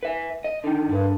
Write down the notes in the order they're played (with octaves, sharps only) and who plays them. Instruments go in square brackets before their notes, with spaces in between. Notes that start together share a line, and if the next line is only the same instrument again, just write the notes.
[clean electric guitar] B4 E5
D#5
D3 D#3
[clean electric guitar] C2 D3 [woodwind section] G2